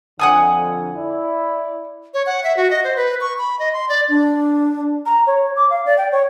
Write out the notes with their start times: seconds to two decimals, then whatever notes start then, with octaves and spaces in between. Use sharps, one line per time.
0.20 F2 D3 F#5 G#5 D#6
0.94 E4 D5
2.14 C#5
2.26 F#5
2.44 E5
2.57 F#4
2.70 D#5
2.84 C5
2.96 B4
3.21 C#6
3.38 B5
3.59 D#5
3.73 C6
3.89 D5
4.08 D4
5.06 A#5
5.27 C#5
5.56 D6
5.70 F5
5.86 D5
5.98 G5
6.12 C#5